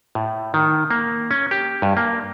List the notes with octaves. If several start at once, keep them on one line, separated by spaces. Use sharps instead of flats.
A2
D#3
A#3
C#4
G4
G2
A#3